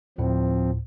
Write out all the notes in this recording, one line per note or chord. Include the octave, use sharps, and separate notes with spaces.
D2 A2 F3 C4